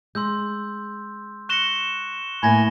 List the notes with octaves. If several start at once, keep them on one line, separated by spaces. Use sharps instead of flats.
G#3 C6 E6 G6
C#6 F#6 A#6 C#7 E7 G7
A2 A#3 G#5 B5 G#6 A#6